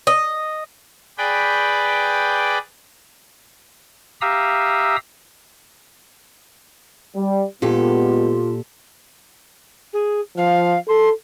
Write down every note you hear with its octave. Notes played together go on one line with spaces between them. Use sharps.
D#5
G#4 B4 D5 G5 B5
G4 E5 F5 A#5 D#6 E6
G3
A#2 G#3 B3 F4 G4 A4
G#4
F3 F5
A4 C6